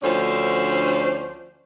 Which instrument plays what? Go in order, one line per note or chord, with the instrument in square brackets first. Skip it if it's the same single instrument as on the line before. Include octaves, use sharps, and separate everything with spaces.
[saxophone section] D2 D3 F3 C#4 C5 D5